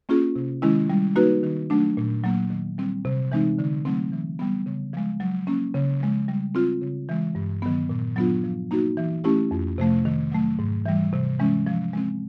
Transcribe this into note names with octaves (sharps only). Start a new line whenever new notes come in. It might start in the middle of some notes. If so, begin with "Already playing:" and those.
A#3 C#4 F4 G#4
C3
D#3 G#3 C#4 E4
G3
A#3 D#4 F#4 B4
D#3
F#3 A3 D4
A#2
F#3 A#3
D#3
G3 C4
C3
E3 G#3 C4 D#4
D3
F#3 A3 C4
E3
G3 B3
C#3
F3 G#3
F#3
A#3 C#4
C#3
F3 G#3
G3
C4 F4
C#3
E3 G#3
G2
D#3 F#3 B3
A#2
F#3 B3 D4 F4
F3
A#3 D#4 F#4
E3
A3 C#4 E4 G4
F2
C3 F3 A3
D#3
F#3 A3
G#2
E3 G3
C3
E3 G#3 C#4
F3
G#3 C4